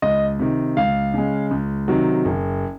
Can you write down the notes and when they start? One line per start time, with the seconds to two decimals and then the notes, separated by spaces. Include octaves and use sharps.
0.02 C#2 D#5
0.39 C3 D#3
0.77 C#2 F5
1.14 C#3 G#3
1.51 C#2
1.88 C3 D#3 F#3
2.25 F#1